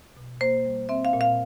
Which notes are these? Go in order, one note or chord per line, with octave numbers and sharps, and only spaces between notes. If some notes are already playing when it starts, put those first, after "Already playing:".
B2
A#3 C5
G3
C4 E5
F5
A#2
F5